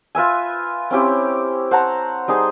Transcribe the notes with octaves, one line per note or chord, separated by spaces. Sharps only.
F4 B4 E5 G#5
C4 C#4 E4 G4
C5 F#5 A5 A#5
G3 D#4 G#4 C5